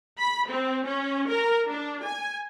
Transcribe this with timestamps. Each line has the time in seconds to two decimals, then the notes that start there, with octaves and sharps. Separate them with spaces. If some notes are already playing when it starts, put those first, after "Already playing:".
0.19 B5
0.49 C4
0.85 C#4
1.29 A#4
1.68 D4
2.04 G#5